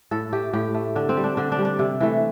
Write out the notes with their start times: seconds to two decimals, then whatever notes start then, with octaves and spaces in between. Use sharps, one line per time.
0.11 A2 A4
0.32 A3 G4
0.53 A2 G4
0.74 A3
0.96 D3 D4
1.09 C4
1.17 G3
1.24 D4
1.37 D3 D4
1.52 D4
1.58 G3
1.65 D4
1.79 C3
2.00 E3 A3